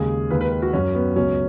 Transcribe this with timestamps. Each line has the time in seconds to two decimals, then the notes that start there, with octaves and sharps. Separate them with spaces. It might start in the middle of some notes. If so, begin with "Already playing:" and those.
Already playing: D#2 C#3 G#3 G#4
0.30 D#2 D#3 G#3 B4
0.41 B4
0.52 B4
0.62 F#4
0.73 F#2 F#3 C#4
0.95 B3
1.16 C#2 B2 F#3 C#4